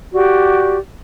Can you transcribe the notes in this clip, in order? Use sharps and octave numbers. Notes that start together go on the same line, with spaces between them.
F#4 G4 D5